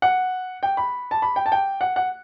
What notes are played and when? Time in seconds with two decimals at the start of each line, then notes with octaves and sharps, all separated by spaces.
0.02 F#5
0.63 G5
0.77 B5
1.11 A5
1.22 B5
1.36 G5
1.46 A5
1.52 G5
1.81 F#5
1.96 F#5